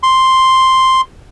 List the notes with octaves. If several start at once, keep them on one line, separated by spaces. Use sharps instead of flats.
C6